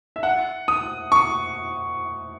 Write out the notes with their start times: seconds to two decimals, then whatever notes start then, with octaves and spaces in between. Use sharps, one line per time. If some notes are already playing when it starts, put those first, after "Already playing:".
0.16 E5
0.23 F#5
0.68 D#6
1.12 C#6